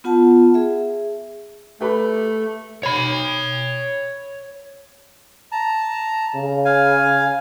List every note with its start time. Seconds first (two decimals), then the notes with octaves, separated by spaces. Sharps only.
0.04 B3 F4 F#5 A5
0.54 G#4 E5
1.81 A3 G4 B4 B5
2.83 C#5 B5
5.52 A5 A#5
6.35 C#3
6.65 F5 G#5